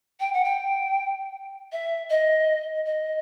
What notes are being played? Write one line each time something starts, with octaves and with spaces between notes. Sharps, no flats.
G5
F#5
G5
E5
D#5
D#5